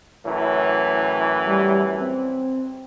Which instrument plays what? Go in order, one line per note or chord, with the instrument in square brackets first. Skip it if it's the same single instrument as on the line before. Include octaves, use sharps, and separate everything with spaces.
[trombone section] F#2 A2 E3
[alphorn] G3
C4